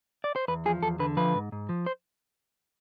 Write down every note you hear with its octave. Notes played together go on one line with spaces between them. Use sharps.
D5
C5
E2 B4
F3 G#4
E2 A4
D3 B4
F3 B4
G#2
G#2
F3
C5